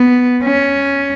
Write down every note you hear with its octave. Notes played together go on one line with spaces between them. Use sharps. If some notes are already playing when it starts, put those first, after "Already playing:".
Already playing: B3
C#4